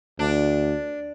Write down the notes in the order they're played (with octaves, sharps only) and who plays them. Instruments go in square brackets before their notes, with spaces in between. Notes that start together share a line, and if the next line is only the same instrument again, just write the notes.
[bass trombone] D2 [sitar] D4